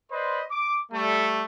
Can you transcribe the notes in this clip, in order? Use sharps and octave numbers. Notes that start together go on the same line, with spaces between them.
B4 C5 D5 D#5 B5 C6
D6
G3 A3